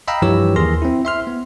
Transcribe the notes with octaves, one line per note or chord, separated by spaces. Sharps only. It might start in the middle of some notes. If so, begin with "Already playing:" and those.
D#5 F5 G5 A#5 B5 E6
G2 E3 F3 G4 C#5 E6
D#2 G#4 A#4 C6 F6 A#6
C4 E4
E5 C6 F6
B3